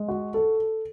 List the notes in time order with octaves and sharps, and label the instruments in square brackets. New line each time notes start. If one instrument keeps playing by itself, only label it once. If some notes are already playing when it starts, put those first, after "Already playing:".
Already playing: [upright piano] G#3
F#4
A4